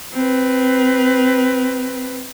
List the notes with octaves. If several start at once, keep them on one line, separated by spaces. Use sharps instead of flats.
C4 B4